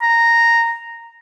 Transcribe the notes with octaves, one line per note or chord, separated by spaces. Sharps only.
A#5